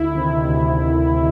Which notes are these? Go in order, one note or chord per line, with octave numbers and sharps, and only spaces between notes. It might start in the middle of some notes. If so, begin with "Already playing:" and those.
Already playing: D2 E4
C3 D#3
D2